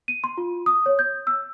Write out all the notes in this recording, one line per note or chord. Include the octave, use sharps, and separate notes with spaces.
D#7
C6
F4
D#6
C#5
G6
E6